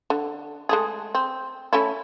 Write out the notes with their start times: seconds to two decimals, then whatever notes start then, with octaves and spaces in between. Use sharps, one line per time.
0.10 D3
0.69 G#3 A3 G#4
1.15 C4
1.73 A3 C#4 E4